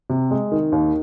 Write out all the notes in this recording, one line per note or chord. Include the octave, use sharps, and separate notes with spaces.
C3
G#3
D#3
D#2